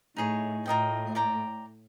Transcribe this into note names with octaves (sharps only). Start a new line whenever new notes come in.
A2 D#4 G#4 C#5
A2 F4 A#4 D#5 G5
D5 G5 A#5